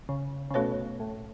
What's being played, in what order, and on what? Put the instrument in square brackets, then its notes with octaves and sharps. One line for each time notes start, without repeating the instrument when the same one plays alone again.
[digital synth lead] C#3
C#3
[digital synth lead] B2 [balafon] A3 C#4 F#4 A4 C#5
[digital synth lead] A2